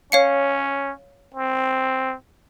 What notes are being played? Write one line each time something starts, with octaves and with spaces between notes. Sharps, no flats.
C#4 C#5 F5 C#7
C4